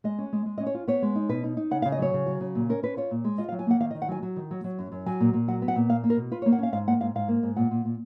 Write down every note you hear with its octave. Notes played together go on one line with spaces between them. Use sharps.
G#3 D#5
C#4
G#3
G#3
C#4 D#5
C#5
F4
B3 C#5
G#3
D#4
B2 B4
D#4
D#4
C#3 F#5
F5
C#3
D#5
F#3 C#5
C#3
F#3
C#3
A#2
C#4 A#4
C#4 B4
F4 C#5
A#2
G#3
F4 D#5
F5
F#3
G#5
A#3 F#5
D#3 F5
D#5
D#3
F#5
F#3 G#5
F#3
D#3
F#3
F#3
F#2
F#2
F#3 G#5
A#2
A#2
F#3 F#5
B3
F#5
A#2
A#3 F5
A#3
A#4
B2
F4 B4
C#5
A#3
F#5
C#4 F5
G#2 F5
A#3 F#5
G#2 F5
G#2 F5
A#3
G#2
A#2 F#5
A#2
A#2